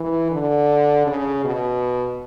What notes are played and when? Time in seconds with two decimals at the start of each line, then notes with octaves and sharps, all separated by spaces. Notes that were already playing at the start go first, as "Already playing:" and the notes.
Already playing: E3
0.31 D3
1.07 C#3
1.45 B2